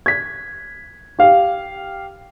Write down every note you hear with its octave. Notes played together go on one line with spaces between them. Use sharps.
G#6 B6
G4 F5